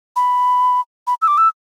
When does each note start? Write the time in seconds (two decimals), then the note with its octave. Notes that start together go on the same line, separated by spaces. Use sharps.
0.16 B5
1.07 B5
1.22 E6
1.28 D6
1.38 E6